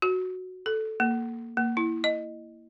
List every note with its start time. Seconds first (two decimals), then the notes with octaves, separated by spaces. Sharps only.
0.02 F#4
0.66 A4
1.00 A#3
1.57 A#3
1.77 E4
2.04 D#5